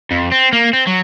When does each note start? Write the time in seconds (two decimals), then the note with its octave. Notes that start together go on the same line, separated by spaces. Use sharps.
0.11 F2
0.32 C4
0.53 A#3
0.73 C4
0.87 F#3